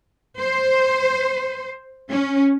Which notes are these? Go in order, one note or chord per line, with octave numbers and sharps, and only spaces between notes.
C5
C#4